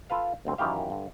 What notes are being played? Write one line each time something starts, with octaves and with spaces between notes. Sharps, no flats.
F4 A4 B4 F5
G1 D2 C4
F#2 D#3 E3 G4 F5
G2 D3